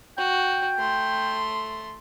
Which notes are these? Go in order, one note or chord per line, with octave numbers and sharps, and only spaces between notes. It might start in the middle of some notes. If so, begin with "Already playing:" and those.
F#4 G5
A3 C6